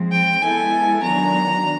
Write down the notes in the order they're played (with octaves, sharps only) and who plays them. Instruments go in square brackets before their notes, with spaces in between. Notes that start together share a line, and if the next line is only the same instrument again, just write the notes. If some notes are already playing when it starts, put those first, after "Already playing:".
Already playing: [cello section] F3 G#3 C4
[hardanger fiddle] G5
[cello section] G#3 B3 E4 A4 [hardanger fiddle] G#5
[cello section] D#3 F#3 B3 D4 F#4 [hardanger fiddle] A#5